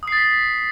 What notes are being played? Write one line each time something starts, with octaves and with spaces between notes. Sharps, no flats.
D#6 A6 B6 C7